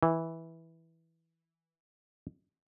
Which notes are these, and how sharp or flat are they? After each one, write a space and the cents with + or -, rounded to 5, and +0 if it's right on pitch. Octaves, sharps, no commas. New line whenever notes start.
E3 -10